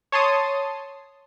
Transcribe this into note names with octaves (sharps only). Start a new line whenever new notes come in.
C#5 A5 C6 D#6